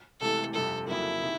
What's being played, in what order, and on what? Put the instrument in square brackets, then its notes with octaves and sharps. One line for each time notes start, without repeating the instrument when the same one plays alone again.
[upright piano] C#2 C3 E3 A3 [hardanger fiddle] A4
[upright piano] G1 F2 C3 [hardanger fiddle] A4
[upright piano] F2 C#3 F#3 A#3 [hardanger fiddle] E4
[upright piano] C3 D#3